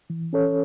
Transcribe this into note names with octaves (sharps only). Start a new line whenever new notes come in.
E3
C#4 A4 C#5